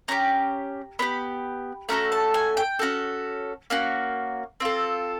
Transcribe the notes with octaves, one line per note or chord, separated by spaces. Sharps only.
C#4 E4 G4 A#5
B3 D4 G4 B5
A3 C#4 F#4 A4 A#5
A5
G#5
G5
C#4 F#4 A4
A#3 C#4 F#4
C4 F4 A4